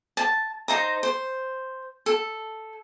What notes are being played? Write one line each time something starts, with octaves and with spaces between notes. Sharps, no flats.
A5
D#4 C5 A#5
C5
A4